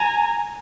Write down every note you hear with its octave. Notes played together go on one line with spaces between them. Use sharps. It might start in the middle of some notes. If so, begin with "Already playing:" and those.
Already playing: G#5 A#5